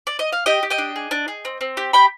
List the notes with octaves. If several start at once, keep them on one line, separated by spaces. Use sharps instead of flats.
D5
D#5
F5
G4 D#5 G5
G4
D#5 G5
D4
G#4
D4
G#4
C4
C4
G4
G4 G5 B5